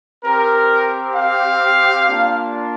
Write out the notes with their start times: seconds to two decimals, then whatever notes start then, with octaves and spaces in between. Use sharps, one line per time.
0.24 C4 G4 A#4
1.14 F5
2.06 A#3 D4 F4